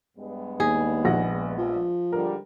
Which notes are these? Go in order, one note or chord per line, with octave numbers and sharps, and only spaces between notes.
G2 G#3 B3
D#2 G#4
A#1 F#5 A#6
F3
G#2 D3 G3 A#4